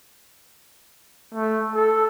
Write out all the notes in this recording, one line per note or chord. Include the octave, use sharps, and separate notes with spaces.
A3
A4